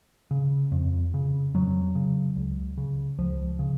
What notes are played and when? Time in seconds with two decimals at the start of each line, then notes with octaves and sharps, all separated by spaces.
0.31 C#3
0.72 F2
1.14 C#3
1.54 F2 F#3
1.95 C#3
2.36 C#2
2.78 C#3
3.18 C#2 F3
3.59 C#3